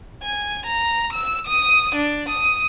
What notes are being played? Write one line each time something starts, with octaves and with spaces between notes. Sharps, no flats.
G#5
A#5
E6
D#6
D4
D#6